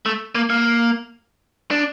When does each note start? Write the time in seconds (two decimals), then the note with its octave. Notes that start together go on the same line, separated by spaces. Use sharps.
0.06 A3
0.35 A#3
0.50 A#3
1.71 D4